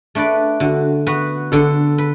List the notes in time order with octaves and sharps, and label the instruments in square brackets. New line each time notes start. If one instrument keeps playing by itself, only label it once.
[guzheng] A3 D4 B4 D5
[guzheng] D3 [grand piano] F#4
[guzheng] B3 F#4 B4
[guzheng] D3 [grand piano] A4
[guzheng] B4